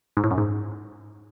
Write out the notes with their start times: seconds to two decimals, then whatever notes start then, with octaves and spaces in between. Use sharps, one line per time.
0.17 G#2
0.24 A2
0.31 F#2
0.38 G#2